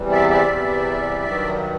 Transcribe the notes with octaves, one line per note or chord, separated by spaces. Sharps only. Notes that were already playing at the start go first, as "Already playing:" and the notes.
Already playing: E2 C3 E3 G3
D5 E5
D5 E5
E2 C3 E3 G3
G2 D#3 F#3